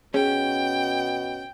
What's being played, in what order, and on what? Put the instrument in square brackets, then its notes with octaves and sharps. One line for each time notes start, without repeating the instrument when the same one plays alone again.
[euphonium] B2 [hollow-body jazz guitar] C#4 [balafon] G#4 [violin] G5